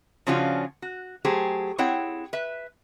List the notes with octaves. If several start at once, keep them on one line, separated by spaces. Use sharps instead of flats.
C#3 F3 C#4 D4 F4 F#4
F#4
F#3 A3 G4 G#4 C5
C4 E4 G#4 C#5 F#5 G5
B4 E5